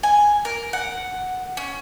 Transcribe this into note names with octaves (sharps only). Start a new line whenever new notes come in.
G#5
A#4
F#5
C#4